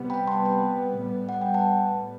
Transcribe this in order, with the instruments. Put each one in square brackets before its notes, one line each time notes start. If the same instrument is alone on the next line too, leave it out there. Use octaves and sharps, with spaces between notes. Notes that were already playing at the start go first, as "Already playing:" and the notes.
Already playing: [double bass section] C3 G3 B3
[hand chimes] G5 B5
A5 C6
G5 B5
[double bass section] A2 G3 B3
[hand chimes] F#5
G5
F#5 A5